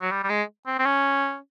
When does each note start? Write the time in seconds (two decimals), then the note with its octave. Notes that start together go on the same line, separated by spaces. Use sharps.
0.01 F#3
0.11 G3
0.24 G3
0.29 G#3
0.66 C4
0.79 C4
0.85 C#4